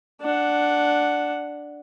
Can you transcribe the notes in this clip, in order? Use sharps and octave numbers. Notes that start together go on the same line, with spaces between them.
D4 F#5